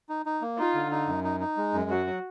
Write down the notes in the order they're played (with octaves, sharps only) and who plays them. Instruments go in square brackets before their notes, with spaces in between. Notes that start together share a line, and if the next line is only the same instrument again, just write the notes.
[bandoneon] D#4
D#4
A#3
[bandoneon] D#4 [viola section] F4
[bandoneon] D3
D#4
F#2
D#4
D#4
G#3
F#2
[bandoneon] F#3 [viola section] F#4
[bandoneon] F#3